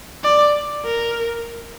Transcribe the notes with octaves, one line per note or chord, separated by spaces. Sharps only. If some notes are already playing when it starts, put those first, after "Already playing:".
D5
A#4